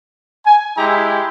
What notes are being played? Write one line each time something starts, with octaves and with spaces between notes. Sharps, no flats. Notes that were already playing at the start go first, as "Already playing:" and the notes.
G#5
G#3 E4 G4 A#5